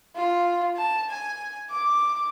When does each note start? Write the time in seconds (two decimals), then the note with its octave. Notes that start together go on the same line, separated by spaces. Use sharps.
0.16 F4
0.77 A5
1.09 G#5
1.70 D6